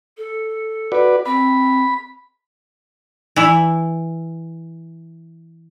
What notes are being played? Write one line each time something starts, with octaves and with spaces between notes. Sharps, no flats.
A4
F#4 B4 D5
C4 B5
E3 E4